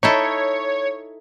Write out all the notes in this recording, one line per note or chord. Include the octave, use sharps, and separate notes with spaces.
D#4 E4 A4 C#5